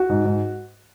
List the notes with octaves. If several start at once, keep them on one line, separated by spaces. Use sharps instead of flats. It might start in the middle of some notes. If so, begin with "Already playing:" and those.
Already playing: F#4
G#2
G#2